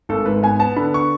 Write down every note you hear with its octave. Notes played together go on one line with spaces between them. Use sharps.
G#1 A4
G#2 B4
B3 G#5
B3 A5
D3 B5
C#6